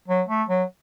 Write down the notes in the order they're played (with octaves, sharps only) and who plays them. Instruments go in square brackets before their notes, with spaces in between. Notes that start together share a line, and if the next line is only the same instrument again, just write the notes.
[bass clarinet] F#3
A3
F#3